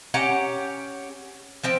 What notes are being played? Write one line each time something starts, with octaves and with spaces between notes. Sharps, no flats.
C#4 G4 F#5 A#5
F3 C4 G5 A5